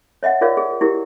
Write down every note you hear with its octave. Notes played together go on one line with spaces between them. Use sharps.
C#5 D#5 E5 F#5
F4 G#4 A#4 C#5 D5 F5
G#4
E4 G4 A#4